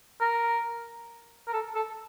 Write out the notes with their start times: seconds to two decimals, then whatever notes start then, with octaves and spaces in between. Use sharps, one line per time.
0.21 A#4
1.48 A#4
1.53 A4
1.75 A4